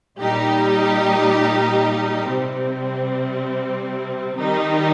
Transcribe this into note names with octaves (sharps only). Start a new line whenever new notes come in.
A#2 G3 D#4 G4
C3 G3 C4
D#3 G3 D#4 G4